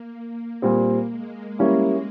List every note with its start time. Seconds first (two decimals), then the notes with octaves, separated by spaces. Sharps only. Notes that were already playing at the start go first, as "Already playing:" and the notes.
Already playing: A#3
0.13 A#3
0.62 A#2 G3 A#3 C4
1.10 G#3
1.59 G3 A#3 C#4 E4